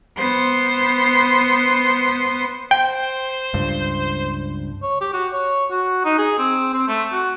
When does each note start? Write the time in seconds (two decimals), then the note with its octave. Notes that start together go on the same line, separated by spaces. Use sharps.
0.18 B3 C5
2.71 C5 G5
3.54 C#2 G2
4.83 C#5
5.01 G4
5.14 F#4
5.33 C#5
5.71 F#4
6.05 D#4
6.18 G#4
6.38 C4
6.74 C4
6.88 A3
7.13 F#4